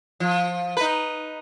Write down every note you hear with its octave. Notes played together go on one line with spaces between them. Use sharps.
F3
D#4 B4